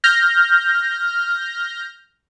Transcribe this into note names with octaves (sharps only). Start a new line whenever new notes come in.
F6 G6 A#6